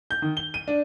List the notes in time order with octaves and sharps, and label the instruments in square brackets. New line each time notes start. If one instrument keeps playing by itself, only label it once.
[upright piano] G6
D#3
G7
D#7
D4